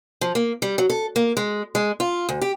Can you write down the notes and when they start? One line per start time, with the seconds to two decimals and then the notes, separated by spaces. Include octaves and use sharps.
0.21 F3
0.35 A#3
0.62 G3
0.78 F#3
0.90 A4
1.16 A#3
1.37 G#3
1.75 G#3
2.00 F4
2.29 D2
2.42 G4